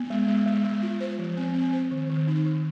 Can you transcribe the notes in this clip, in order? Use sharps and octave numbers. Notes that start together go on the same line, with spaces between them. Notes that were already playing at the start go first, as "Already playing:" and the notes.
Already playing: B3
G#3
G#3
G#3
G#3
F4
C5
F3
C4
C4
C5
D#3
D#3
D#4
D#3